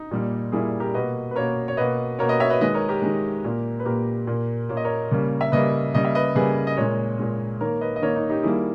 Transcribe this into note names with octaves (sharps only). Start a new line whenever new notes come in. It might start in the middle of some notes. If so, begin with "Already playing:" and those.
Already playing: D#4
A#2 G3 A#3
A#2 G3 A#3 E4 G#4
G4 A#4
B2 A#3 B4 D#5
B4
B2 A#3 A#4 C#5
C#5
B2 A#3 B4 D#5
B2 A#3 A#4 C#5
B4 D#5
C#5 E5
B4 D#5
D#3 G#3 B4 D#5
A#4 C#5
G4 A#4
D#3 G#3
A#2 A#3
B4
A#2 A#3 G4 A#4
A#2 A#3
A#2 A#3 C#5
D#5
A#4 C#5
C#3 G3 A#3
E5
C#3 G3 A#3 B4 D#5
C#3 G3 A#3 D#5
E5
B4 D#5
C#3 G3 A#3 G#4 B4
D#5
A#2 G#3 A#4 C#5
A#2 G#3
D#3 A#3 A#4 C#5
B4 D#5
D#5
D#3 A#3 A#4 C#5
D#4
D#4 G4
D#3 G3 A#3 E4 G#4